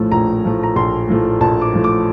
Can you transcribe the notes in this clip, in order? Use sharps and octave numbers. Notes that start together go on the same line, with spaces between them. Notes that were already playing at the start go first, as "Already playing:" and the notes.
Already playing: A#1 A2 F3 A3
A#1 A#5
A2 F3 A3
A#5
A#1 C6
A2 F3 A3
A#1 A5
D6
A2 F3 A3
D6